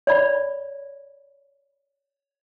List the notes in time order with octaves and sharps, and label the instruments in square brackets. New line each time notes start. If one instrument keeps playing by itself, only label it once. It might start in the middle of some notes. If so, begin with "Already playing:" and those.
[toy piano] C#5 D5 B5